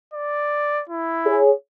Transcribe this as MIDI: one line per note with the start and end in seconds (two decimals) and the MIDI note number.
0.14 0.83 74
0.89 1.42 64
1.27 1.51 68
1.27 1.51 73